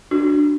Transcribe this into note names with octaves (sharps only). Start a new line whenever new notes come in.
D4 F#4